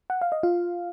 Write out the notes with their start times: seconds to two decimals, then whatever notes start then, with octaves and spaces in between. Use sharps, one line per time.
0.10 F#5
0.22 F5
0.32 D#5
0.43 F4 F5